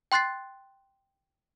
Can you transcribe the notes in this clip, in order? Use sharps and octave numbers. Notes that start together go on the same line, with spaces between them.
G5 C6 F#6 A6 C7